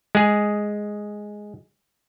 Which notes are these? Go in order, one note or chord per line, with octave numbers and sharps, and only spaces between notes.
G#3 G#4